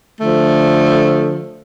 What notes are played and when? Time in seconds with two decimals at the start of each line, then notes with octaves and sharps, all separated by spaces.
0.21 D3 F3 A3